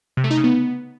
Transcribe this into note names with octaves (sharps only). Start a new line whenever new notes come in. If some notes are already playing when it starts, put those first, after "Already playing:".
C3
A3
D#4
C#3
B3